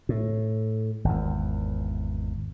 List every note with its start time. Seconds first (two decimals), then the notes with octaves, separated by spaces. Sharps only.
0.09 A2
1.05 G#1 E2